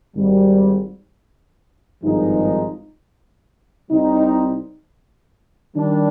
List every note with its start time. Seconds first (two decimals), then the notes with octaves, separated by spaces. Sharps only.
0.15 G#1 G#2 G3
2.02 G#1 G2 F3 G#3 D#4
3.88 C2 C3 G3 C4 D#4
5.75 D#3 G3 D4